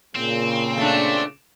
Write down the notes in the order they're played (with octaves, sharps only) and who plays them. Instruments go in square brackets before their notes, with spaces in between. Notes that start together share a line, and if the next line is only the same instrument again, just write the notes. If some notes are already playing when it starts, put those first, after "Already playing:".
[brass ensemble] A#2 C#3 [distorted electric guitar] C4
[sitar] A3 D4